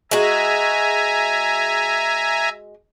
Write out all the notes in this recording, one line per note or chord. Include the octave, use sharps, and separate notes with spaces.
G#3 F#4 E5 G#5 A#5